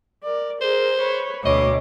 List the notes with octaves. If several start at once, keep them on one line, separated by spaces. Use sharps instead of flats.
A#4 D5
G#4 A#4 C5
B4 C#5
D2 B2 C#5 D#5 D6